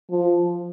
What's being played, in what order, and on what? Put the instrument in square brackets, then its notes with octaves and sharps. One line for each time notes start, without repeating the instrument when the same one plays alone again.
[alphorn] F3